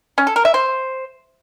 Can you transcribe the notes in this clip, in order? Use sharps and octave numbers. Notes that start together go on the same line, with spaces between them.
C#4
A4
A#4
E5
C5